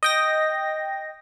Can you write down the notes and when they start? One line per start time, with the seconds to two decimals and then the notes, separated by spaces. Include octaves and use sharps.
0.03 D#5 G5 A#6